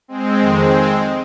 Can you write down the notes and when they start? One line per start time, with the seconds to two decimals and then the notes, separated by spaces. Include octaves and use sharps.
0.08 G#3 C4
0.40 F2 D#3